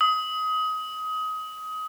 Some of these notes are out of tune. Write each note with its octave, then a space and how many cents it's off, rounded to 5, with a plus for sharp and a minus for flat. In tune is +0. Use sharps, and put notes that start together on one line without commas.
D#6 +25